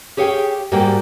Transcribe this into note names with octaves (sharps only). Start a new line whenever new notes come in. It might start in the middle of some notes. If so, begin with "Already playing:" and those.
G4 G#4 C#5 F5 G5
G#2 G3 A#3 F#4 D5 G5